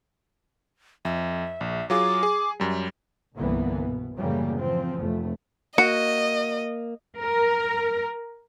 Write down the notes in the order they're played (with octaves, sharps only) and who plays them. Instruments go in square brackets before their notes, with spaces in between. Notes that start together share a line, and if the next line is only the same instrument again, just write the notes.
[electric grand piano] F2 [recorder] E5
[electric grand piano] A#1
[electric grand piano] F#3 F4 G#4 [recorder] D6
[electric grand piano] G#4
F#2 G3
[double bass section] G1 C2 D3 E3 A#3 B3
B2
F#2 A2 C#3 E3 G3 A#3
E3 F3 C4
F1 A3
[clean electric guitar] A#3 [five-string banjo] F#4 [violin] D#5 [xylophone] C#7
[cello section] A#4